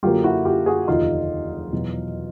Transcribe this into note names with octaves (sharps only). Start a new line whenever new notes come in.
F#2 D3 F#3 A#3 F4 G4
E4 F#4
F4 G4
F#4 G#4
F1 D#2 D3 D#4 F4
E2 B2 F#3